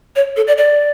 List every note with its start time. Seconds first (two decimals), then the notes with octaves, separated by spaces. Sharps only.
0.16 C#5
0.37 A4
0.47 D5
0.58 D5